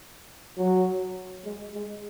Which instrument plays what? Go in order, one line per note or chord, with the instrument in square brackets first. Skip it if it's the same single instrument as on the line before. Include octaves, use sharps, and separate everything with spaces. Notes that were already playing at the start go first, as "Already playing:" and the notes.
[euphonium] F#3
G#3
G#3